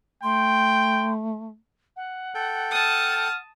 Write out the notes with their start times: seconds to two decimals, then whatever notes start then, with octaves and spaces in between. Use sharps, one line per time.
0.23 A3 G5 C6
1.96 F#5
2.35 A4 G5
2.71 A5 D#6 F6